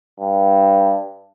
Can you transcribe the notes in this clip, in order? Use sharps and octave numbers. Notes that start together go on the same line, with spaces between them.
G2